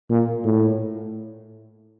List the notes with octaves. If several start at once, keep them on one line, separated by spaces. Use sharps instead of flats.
A#2
A2